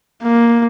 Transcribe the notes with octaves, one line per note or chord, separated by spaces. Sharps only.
A#3